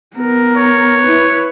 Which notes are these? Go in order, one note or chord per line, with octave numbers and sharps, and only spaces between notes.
B3 A#4
C#5
E4 B4